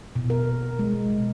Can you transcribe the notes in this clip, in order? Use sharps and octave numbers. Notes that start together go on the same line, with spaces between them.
B2
A#4
G#3
B2